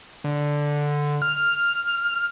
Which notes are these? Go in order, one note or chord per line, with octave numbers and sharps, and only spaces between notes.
D3
F6